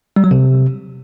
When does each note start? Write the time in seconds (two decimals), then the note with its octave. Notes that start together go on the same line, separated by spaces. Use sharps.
0.16 G3
0.24 F#3
0.31 C3